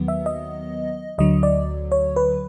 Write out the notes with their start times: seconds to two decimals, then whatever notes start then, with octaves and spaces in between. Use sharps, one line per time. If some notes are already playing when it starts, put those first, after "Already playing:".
Already playing: D#2 D#3 F#3 B3
0.08 E5
0.26 D#5
1.18 D2 D3 F#3 D#5
1.43 D5
1.92 C#5
2.16 B4